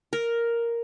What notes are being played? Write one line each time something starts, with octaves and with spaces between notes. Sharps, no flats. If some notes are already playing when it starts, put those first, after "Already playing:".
A#4